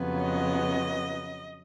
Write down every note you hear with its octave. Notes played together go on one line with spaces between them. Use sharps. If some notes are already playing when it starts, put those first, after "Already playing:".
Already playing: F2 C#3 F#3 B3
D#5